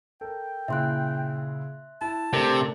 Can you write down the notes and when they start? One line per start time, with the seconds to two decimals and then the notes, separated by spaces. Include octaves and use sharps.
0.21 A4 A#4 G5
0.68 A#2 C#3 E4 E5 C6 F#6
2.01 E4 A5
2.33 C3 A3 D4 A#4